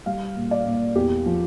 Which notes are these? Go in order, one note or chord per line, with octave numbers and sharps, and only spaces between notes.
G3 F5
A#2
D5
A#2
E2 G4
F3